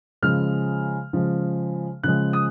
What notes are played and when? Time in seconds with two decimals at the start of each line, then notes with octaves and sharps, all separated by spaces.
0.22 C#3 F3 G#3 F6
1.13 C#3 F3 G#3
2.03 C#3 F3 G#3 F#6
2.33 D#6